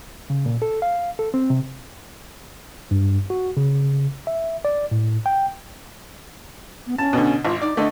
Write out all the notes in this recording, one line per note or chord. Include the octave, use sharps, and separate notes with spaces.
C#3
A#2
A4
F5
A4
C4
C3
G2
F#4
C#3
E5
D5
A2
G5
B3
C#4 A5
B2 D3
G#1 F4
D#4 D5
D3 A3 D#5